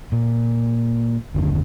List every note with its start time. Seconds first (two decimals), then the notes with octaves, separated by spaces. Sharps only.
0.12 A#2
1.35 F#1 D#2 D3